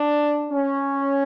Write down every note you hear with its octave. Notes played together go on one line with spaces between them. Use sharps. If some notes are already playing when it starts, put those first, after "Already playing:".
Already playing: D4
C#4